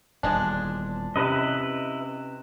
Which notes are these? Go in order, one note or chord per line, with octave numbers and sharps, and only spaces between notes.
D#1 E2 F3 G3 G#3 D4
C3 C#4 E4 B4 D#5